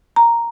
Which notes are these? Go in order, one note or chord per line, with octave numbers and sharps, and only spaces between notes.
A#5